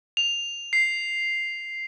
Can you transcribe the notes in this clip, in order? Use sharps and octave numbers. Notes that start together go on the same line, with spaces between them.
F7
C7